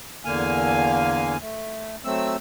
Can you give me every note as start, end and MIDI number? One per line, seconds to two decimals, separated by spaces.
0.25 1.37 40
0.25 1.37 50
0.25 1.37 58
0.25 1.37 77
0.25 1.37 80
1.41 1.96 57
2.05 2.36 54
2.05 2.36 57
2.05 2.36 60
2.05 2.36 88